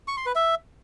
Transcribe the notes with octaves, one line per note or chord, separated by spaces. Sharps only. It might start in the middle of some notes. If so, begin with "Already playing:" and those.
C#6
C6
B4
E5